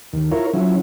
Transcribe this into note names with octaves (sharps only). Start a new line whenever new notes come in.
D#2
E4 F4 A#4 C#5
F3 F#3 C#4 E4